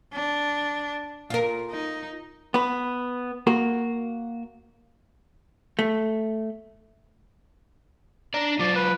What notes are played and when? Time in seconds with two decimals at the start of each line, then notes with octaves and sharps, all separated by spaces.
0.13 D4
1.30 A#2 F4 A#4
1.70 D#4
2.54 B3 B4
3.47 A#3 F#4 A#4
5.79 A3
8.34 D4 D5 A#5
8.59 F#3 F4 D5
8.75 B4